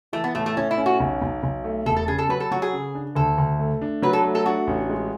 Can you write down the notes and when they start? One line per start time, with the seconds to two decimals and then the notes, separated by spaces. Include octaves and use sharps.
0.13 E3 A3
0.24 B3
0.35 A2 A3
0.46 A3
0.56 A2 C#4
0.71 E4
0.77 C#4
0.86 F#4
1.00 B1
1.21 B1
1.43 B1
1.64 A3
1.86 E1 A4
1.96 A4
2.08 C#3 G#4
2.18 A4
2.29 F#3 B4
2.40 A4
2.51 F#3 F#4
2.62 G#4
2.73 C#3
2.95 D4
3.15 D2 A4
3.38 D2
3.59 A3
3.82 D4
4.02 F#3 B4
4.13 A4
4.24 A3
4.35 A4
4.46 D4 F#4
4.67 A1
4.90 G#3